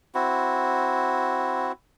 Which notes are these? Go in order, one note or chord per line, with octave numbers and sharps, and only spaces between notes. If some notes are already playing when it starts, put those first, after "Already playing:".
C4 E4 F#4